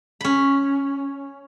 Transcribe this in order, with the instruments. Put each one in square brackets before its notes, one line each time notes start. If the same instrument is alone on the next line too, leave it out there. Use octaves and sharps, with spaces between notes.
[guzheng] C#4 B5